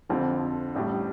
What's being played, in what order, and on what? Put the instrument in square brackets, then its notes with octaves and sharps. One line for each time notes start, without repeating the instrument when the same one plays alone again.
[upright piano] F2 D3 F3 C4 F4
A1 A2 G3